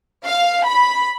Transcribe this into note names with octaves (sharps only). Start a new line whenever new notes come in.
F5
B5